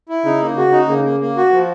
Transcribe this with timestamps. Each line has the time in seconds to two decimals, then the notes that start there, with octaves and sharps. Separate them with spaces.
0.09 E4
0.24 C#3 D#4
0.41 A#3
0.56 C#3 F#4
0.72 D#4
0.88 C#3 A#3
1.04 A#3
1.20 A#3
1.37 F#4
1.52 F3